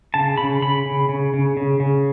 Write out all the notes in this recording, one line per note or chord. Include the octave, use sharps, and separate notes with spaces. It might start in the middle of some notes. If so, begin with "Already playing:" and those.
C#3 A5
C#3 B5
C#3 B5
C#3
C#3
C#3
C#3
C#3